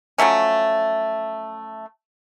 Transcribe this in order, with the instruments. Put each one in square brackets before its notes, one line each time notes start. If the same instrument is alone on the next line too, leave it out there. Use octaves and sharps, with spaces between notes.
[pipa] F3 F#3 A3 C#4